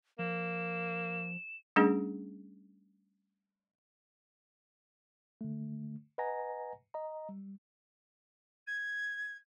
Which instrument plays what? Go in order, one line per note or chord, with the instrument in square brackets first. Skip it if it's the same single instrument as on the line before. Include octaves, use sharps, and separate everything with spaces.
[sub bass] F3 [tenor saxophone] A#3 [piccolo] E7
[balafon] G3 A3 C#4 D4 G#4
[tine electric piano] D3 A3
B4 D#5 F#5 G#5 A#5 A#6
D#5 A#5
G3
[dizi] G#6